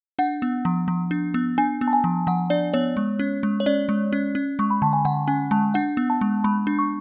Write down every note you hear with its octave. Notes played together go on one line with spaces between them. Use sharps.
D4 F#5
B3
F3
F3
D4
B3
D4 G#5
B3
A5
G#5
F3
F3 F#5
D4 D5
B3 C#5
G#3
C#4
G#3
C#5
C#4 D5
G#3
C#4
C#4
G#3 C#6
B5
D3 A5
G#5
D3 F#5
C#4 G#5
G#3 A5
D4 F#5
B3
A5
G#3
G#3 B5
D4
C#6